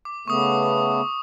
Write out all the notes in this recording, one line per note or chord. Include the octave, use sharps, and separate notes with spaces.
D6
C#3 A3 B3 C#6 D#6